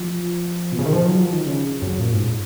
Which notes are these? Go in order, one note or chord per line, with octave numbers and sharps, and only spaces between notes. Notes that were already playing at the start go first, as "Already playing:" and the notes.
Already playing: F3
B2
C#3
D#3
F3
F#3
F3
D#3
C#3
F#2
A#2
G#2